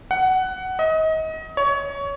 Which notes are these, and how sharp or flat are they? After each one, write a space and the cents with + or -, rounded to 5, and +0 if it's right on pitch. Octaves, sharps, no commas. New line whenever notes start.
F#5 +15
D#5 +30
C#5 +20